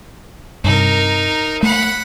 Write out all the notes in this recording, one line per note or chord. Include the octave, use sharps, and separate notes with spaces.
G2 C3 D#4 A#4
A3 F#5 B5